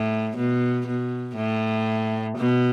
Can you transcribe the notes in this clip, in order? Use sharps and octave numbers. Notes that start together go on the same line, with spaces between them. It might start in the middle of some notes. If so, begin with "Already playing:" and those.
Already playing: A2
B2
B2
A2
B2